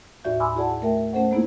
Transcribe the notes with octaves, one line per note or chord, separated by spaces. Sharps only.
D#2 A2 F#4 D5 E5 G6
G#5 B5 C6 D6 E6 F6
E4 F#4 G#4 D5 F#5 A5
A3 A#4 E5 G5
A3 C#4 A4 C5 F#5
G#3 A#3 B3 D#4 E4 G#4